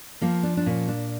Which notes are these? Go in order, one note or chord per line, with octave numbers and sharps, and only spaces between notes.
F3 A#3
D4
D4
A#2 C#4
D4